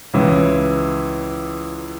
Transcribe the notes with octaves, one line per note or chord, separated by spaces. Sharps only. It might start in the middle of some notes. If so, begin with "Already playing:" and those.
C#2 C#3 E3